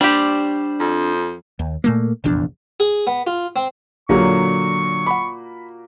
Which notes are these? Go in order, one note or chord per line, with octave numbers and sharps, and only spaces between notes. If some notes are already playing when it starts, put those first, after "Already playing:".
G3 D4 G4 C5 D5
F2
D#2
A#2 A3 A#3
F1 A#1 E2 D4
G#4
B3
F4
C4
A#1 A#2 D3 F#3 A#3 F#4 G4 C#6
F#5 B5 D6